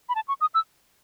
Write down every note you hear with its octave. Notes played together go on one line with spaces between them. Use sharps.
B5
A5
C#6
D#6
E6